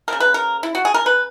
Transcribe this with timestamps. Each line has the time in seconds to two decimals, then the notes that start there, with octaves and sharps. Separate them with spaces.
0.08 C#3 F#3 A#3 A#4
0.20 B4
0.34 A#4
0.63 E4
0.75 F#4
0.85 G#4
0.94 A#4
1.06 B4